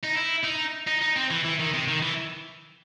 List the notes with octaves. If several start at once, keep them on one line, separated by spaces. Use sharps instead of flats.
D#4
E4
D#4
D#4
D#4
C4
E3
E3
D#3
C3
D#3
E3